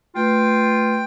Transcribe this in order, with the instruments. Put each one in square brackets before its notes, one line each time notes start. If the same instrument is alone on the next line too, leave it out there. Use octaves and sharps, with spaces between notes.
[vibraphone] A3 B4 [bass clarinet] F4 [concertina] G5